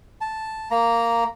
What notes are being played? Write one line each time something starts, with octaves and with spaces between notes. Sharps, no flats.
A5
A#3 A#5